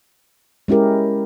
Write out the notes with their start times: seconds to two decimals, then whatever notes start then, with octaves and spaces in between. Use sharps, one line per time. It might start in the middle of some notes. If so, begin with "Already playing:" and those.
0.68 G#3 C#4 E4 G4 A#4